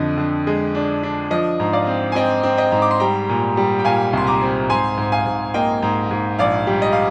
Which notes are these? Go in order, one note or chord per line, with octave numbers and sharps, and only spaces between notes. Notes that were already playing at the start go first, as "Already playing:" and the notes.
Already playing: F2 D3 D#5
D3
G#3
D4
D4
F3 D#5
G#2
D5 F5
C4
G#5
C4 D#5 G5
C4
D#5 G5
G#2
D6
C6
G3 G5 A#5
A#2
G3
G5
A#2 F5 G#5
C2 C6
A#5 D6
C4
G#2 G#5 C6
G#2
F5 G#5
G#2
A#3 D#5 G5
G#2
G#2
A#1 D5 F5
G3
D#5
F5